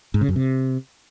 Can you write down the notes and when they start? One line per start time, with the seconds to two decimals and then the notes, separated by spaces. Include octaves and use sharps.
0.14 G#2
0.21 C#3
0.29 F#2
0.36 C3